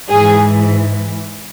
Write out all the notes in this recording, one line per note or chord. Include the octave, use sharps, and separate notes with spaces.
G#2 E3 G#4